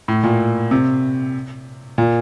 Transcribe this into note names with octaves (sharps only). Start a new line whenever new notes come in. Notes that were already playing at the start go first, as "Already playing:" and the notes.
A2
A#2
C3
A#2